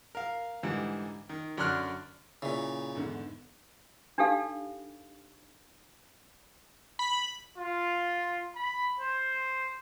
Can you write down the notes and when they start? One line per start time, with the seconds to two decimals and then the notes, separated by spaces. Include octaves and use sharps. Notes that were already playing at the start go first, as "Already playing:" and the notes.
0.15 A#4 F5
0.63 G#2 D3 E3 G3
1.29 D#3
1.58 F#2 D3 D5 C6 F6 F#6
2.42 A#2 C#3 E4
2.95 E2 G#2 D3
4.18 D4 D#4 G4 A4 F5
6.99 B5
7.57 F4
8.55 B5
9.00 C5